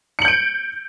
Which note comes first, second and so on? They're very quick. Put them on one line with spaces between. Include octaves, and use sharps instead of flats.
C#7 F#7 G6 D7